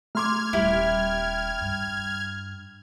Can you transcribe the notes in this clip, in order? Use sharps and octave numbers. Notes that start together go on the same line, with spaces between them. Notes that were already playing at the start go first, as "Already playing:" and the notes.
A3 C6 D6 F6 G#6
D#1 G3 E4 G4
G2